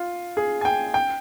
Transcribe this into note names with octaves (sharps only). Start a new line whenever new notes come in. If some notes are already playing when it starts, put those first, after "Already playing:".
Already playing: F4
G#4
G#5
G5
G5